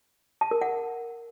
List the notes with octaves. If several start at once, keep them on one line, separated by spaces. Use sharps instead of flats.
A5
A#4
F#5